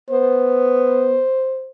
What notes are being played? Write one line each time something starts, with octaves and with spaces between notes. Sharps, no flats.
B3 C5